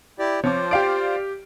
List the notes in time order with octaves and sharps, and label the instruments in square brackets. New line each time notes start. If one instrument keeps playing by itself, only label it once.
[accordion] E4 G4 D5
[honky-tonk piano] F3 C4 D6 [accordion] F4 C5 [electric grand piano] C#5
[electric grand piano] G4 D7 [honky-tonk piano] D5 F5 G5